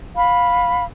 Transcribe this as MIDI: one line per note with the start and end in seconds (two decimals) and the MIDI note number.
0.15 0.84 77
0.15 0.84 83